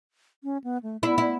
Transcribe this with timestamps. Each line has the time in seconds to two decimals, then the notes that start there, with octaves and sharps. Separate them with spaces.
0.44 C#4
0.64 B3
0.83 A3
1.03 B3 E4
1.18 E4